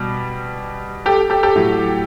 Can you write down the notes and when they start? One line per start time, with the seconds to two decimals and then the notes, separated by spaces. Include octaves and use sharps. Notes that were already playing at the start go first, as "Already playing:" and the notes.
Already playing: B2 G3
1.06 G4 A4
1.30 G4 A4
1.43 G4 A4
1.56 A2 F#3